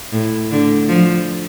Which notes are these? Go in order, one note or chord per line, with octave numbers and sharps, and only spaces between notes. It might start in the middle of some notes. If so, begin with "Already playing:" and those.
A2
D3
F3